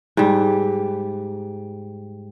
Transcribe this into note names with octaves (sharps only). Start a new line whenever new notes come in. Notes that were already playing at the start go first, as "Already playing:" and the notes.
G#2 G3